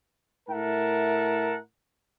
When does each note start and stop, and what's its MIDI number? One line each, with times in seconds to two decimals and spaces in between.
0.49 1.59 45
0.49 1.59 70
0.49 1.59 76
0.49 1.59 78
0.49 1.59 81